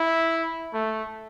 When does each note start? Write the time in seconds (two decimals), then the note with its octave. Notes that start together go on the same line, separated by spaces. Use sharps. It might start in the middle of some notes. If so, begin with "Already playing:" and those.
Already playing: E4
0.73 A3